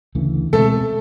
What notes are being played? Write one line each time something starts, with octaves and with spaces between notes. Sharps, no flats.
D2 C#3 E3 A3
B2 G#3 A3 C4 A4